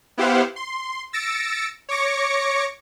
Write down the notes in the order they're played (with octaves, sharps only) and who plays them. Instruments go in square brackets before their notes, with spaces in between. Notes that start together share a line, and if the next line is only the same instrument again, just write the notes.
[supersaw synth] B3 E4 G4 C5 F5 F#5
C6
E6 A6 A#6 C#7 D7
C#5 C#6 D6 A#6 C#7